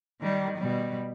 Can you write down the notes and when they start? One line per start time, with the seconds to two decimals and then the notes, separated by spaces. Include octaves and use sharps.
0.21 D#3 G3
0.57 B2 G3